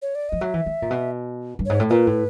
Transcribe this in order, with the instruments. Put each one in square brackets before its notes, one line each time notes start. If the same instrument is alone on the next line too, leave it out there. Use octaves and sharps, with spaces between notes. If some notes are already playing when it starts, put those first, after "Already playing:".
[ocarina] C#5
D5
[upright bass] F3 [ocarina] D#5
[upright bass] F#3 [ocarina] E5
[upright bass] E3
D#3
A#2
B2
G2
[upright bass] G#2 [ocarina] C#5
[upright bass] A2
[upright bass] A#2 [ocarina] B4
[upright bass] A2